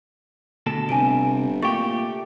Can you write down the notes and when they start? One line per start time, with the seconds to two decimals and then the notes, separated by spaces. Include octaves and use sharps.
0.66 D2 B2 A4
0.89 G1 C3 G#5 D7
1.63 A#2 A3 G4 C#6